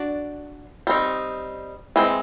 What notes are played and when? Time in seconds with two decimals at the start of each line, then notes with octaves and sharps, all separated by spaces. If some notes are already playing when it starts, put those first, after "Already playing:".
Already playing: D4 F#4 D5
0.87 G3 C4 D#4
1.96 E3 G#3 C4